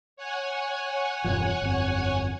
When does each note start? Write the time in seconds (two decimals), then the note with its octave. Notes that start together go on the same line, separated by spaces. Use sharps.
0.17 C#5 F#5 G#5
1.24 E1 G2 F3
1.62 G1 F2